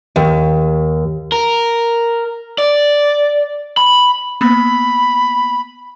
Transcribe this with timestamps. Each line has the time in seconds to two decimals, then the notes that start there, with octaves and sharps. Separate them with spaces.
0.16 D#2
1.32 A#4
2.58 D5
3.77 B5
4.41 A#3 B3 B5